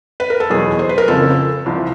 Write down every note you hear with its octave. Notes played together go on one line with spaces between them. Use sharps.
B4
A#4
A4
E2 B2 F#3 G#4
C5
B4
A#4
F#1 F2 C#3 F3 A4
C2 C3 F3